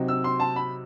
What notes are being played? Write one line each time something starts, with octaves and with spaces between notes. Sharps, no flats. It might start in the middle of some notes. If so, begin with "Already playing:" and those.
Already playing: C3 F#3 C4 D#4
E6
C6
A5
B5